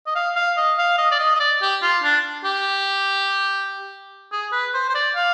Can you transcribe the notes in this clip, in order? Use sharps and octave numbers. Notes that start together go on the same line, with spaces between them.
D#5
F5
F5
D#5
F5
D#5
D5
D#5
D#5
D5
G4
F4
D4
G4
G#4
B4
C5
C5
D5
F5